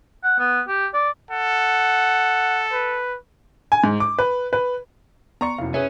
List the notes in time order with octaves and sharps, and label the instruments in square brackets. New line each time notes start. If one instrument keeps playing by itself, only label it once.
[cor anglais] F#5
B3
G4
D5
[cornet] A4 [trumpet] F#5
[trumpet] B4
[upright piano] G#5
G#2
D6
B4
B4
[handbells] B3 D5 C6 [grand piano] A#5 C#6 C#7
[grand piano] F1 F#2 [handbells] E4 F5
[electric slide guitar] C#4 [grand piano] G#4 B4 E5